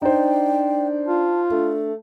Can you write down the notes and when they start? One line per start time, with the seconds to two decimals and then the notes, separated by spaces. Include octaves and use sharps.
0.02 D4 D#4 C5 G5
1.06 F4 A5
1.51 A3 D4